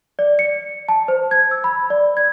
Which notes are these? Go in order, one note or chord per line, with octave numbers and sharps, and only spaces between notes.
D5
C#7
A5
C5
G#6
E6
B5
D5
G#6